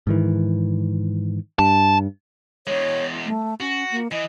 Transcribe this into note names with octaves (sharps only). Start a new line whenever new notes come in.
G#2 D#3 E3
G2 A5
E2 G#3 C#5
A3
C#4 F#4
A#3
E3 D#5